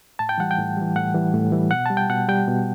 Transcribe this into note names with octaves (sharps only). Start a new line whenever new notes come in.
A2 A5
G5
E3 G3 F#5
G5
A2
E3 G3
A2 F#5
E3 G3
A2
E3 G3
B2 F#5
G3 A5
G5
B2 F#5
G3 G5
B2